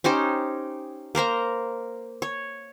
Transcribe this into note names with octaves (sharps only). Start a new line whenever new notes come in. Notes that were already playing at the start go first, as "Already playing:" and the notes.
C#4 D#4 G4 C5
A#3 A#4 C5 A#5
C#5